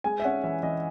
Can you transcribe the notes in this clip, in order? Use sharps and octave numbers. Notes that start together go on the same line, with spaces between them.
G#3 G#5
E5
C#4 F#5
E3 E5
E3 D#5